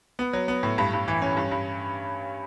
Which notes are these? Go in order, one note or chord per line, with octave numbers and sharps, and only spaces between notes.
B3
F#3
B3
A2
G2
G2
E3
C#4
G2
G2